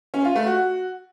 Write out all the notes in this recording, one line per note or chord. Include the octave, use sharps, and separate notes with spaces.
C#4
F4
A3
F#4